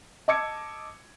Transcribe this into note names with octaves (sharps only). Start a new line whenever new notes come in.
D#5 A5 D6 E6 G#6 C#7